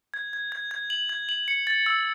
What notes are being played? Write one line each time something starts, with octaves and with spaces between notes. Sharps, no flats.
G#6
G#6
G#6
G#6
F#7
G#6
F#7
C#7
A6
E6